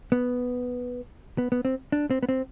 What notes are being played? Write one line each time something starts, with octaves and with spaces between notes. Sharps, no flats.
B3
B3
B3
C4
D4
C4
B3
C4